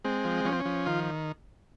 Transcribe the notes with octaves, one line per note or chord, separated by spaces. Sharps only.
G#3 C4
F3
F3 C#4
C4
C#4
F3
D#3 F4